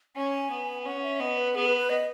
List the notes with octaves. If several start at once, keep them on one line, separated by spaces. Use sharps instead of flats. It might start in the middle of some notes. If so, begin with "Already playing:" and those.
C#4 G#5
B3
C#4 F#5
E5
B3 D#5
B4
B3 G#4
B4
B4
D#5